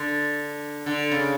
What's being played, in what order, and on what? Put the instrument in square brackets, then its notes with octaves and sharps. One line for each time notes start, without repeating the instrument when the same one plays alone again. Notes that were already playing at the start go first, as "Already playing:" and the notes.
Already playing: [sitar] D3
D3
C#3